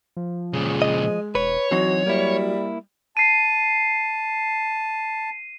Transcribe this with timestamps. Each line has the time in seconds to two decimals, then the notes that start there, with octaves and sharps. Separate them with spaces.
0.17 F3
0.53 A#2 C#3 G#3
0.82 D#5
1.35 E1 B4 C#5
1.71 E3 F#3 C4 D#4 F#4
2.06 G3 A#3 E4
3.17 A5 C7 D#7